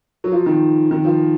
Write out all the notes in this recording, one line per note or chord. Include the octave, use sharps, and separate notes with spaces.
F#3
F3
D#3
D#3
F3